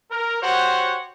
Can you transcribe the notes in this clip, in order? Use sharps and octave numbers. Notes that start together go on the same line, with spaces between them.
A#4
F#4 G4 C5 C#5 F#5